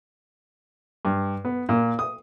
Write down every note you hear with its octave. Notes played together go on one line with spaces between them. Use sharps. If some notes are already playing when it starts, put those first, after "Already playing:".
G2
B3
A#2
D#6